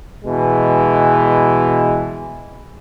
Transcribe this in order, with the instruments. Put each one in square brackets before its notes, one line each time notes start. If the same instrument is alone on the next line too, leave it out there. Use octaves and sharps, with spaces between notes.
[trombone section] B2 E3 G#3